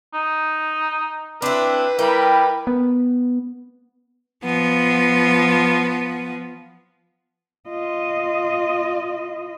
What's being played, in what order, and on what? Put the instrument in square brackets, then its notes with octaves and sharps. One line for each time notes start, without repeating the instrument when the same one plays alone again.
[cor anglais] D#4
[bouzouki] C4 E4 [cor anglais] D4 [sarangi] B4
[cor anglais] G3 [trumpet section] E4 A#4 [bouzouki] G5
[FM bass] B3
[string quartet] F3 B3
[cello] F4 D#5